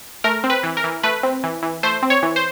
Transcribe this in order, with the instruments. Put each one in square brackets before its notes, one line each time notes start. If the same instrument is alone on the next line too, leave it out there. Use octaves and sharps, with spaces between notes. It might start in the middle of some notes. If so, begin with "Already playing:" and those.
[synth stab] A3 A#4
C4
B4
E3
A#4
E3
A3 B4
C4
E3
E3
A3 C5
C4
C#5
E3
C5